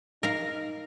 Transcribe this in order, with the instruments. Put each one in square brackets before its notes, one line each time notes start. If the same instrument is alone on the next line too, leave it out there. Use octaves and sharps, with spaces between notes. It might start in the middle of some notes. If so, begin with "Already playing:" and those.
[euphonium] D#4 [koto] A#4 F5